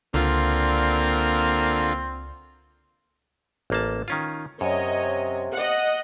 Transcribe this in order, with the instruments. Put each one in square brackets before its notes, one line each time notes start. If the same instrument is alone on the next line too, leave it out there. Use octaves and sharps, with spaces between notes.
[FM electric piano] C#2 D5 F6 [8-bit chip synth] D3 F4 [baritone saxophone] A#3 [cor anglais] C4
[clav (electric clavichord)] A1 A#3 A5
D#3 C#4 F4
[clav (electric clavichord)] F#2 [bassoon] C3 [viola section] C#5 D#5
[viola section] D#5 F#5